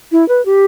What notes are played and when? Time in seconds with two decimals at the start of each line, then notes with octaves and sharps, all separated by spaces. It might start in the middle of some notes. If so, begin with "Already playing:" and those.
0.12 E4
0.29 B4
0.46 G4